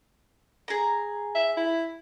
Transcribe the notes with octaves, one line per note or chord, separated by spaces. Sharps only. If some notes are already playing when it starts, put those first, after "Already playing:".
G#4 A#5
E5
E4